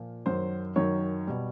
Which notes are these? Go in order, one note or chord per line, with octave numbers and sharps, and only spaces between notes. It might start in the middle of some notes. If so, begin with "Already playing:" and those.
Already playing: A#2 F3
F#2 D#3 F#3 C5
F#2 D#3 F#3 C#5
B2 G3